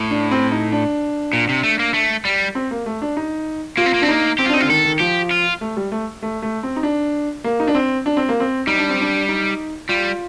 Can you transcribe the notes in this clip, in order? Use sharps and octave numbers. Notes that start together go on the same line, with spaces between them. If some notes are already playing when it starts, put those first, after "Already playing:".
Already playing: A2
D4
C4
D#4
D4
A#2
C3
A3
A#3
A3
G3
C4
A#3
A3
D4
D#4
A#3 F4
C4
A#3
C4 D4
A#3 D#4
C4 G4
F4
D4
C4 D#4
D3 F4
D#3 A4
D#3
F3 G4
F4
A3
G3
A3
A3
A3
C4
D#4
D4
A#3
D#4
D4
C4
D4
C4
A#3
C4
G3 D#4
D4
C4
D4
D#4
G3 F4